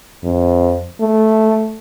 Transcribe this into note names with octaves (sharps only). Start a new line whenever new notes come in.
F2
A3